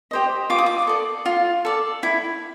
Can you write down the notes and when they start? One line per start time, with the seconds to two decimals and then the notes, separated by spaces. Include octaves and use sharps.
0.11 G4 C5 D#5
0.50 F4 D6
0.58 D#6
0.66 D6
0.87 A4 D5
1.26 F4
1.65 A4 D5
2.03 E4